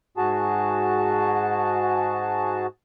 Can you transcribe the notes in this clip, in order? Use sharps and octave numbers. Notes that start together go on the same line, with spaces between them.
G#2 F#4 G#4 A5